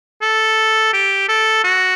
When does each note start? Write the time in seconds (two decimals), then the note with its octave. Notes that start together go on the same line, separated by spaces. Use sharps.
0.22 A4
0.93 G4
1.29 A4
1.64 F#4